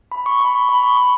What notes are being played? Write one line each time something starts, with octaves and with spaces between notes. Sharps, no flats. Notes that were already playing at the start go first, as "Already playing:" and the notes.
B5
C#6
B5
C#6
B5
C#6
C#6